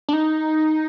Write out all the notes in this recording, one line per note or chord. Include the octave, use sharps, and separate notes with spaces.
D4
D#4